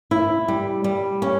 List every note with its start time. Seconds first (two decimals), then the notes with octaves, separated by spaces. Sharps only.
0.11 E4
0.48 G3
0.84 G3
1.22 C#4